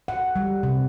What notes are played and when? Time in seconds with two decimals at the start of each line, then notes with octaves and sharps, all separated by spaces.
0.08 F#5
0.36 G3
0.63 C3